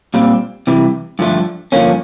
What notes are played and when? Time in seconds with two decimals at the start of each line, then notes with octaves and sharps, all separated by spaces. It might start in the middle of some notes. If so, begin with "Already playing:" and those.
0.14 A#2 G3 C4
0.67 C3 E3 G3
1.19 G2 D3 F3 A3
1.72 G2 D3 F3 A#3 C#4